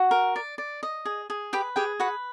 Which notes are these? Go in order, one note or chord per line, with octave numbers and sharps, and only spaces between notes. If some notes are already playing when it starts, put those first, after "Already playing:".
Already playing: F#4 F#5
A#4
D5
D5
D#5
G#4
G#4
G4 B4 G5
G4 G#4 G5
F#4 B4 F#5